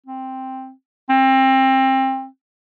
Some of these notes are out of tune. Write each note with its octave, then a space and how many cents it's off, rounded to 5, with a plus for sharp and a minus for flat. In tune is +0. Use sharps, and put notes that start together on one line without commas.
C4 +5
C4 +25